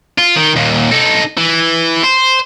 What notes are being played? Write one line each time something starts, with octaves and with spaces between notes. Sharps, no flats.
F4
D#3
D#2 A#2
D#4 A4
E3
C5